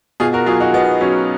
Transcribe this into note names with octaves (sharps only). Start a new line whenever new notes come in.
B2 F4 G#4
F#4 A#4
F#3 F4 G#4
D#4 F#4
B2 B3 D#4
F#3 C#4